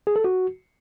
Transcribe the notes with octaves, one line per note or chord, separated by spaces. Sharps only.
G#4
A4
F#4